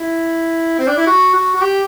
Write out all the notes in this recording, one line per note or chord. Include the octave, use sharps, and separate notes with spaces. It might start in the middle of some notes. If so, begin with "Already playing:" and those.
Already playing: E4
C4
D4
E4
F#4
F#4
F#4
G4